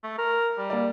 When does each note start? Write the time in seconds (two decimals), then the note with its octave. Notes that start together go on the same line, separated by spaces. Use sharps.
0.03 A3
0.18 A#4
0.58 G3
0.70 A#3 D5